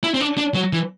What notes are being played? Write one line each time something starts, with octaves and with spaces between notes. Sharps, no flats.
E4
C4
D4
D4
F#3
E3